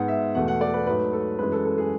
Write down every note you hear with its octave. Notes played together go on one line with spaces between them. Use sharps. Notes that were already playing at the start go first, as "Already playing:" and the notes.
Already playing: G#2 G#3 B3 F#5
E5
E2 B2 A3 F#5
F#5
D5
B4
G#2 F#3 A3 B4
A4
F#2 E3 G#3 B4
A4
A4
G#4